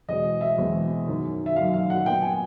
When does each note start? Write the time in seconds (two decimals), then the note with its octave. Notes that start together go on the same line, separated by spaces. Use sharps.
0.09 E2 B2 G#3 C4 D#5
0.41 E5
0.58 E2 B2 G#3 C4
1.07 F#2 D#3 F#3
1.46 E5
1.56 F#2 D#3 F#3 F5
1.74 F5
1.90 F#5
2.06 A#2 F#3 B3 G5
2.22 G#5